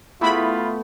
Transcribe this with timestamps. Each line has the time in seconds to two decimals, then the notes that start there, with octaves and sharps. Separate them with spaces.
0.21 A3 B3 E4 F4 B5